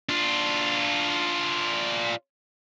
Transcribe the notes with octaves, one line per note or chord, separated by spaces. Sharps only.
D4 F4